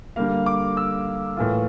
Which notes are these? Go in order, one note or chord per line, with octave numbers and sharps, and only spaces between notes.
D3 G3 A#3 F5
D6
E6
A2 E3 A#3 F4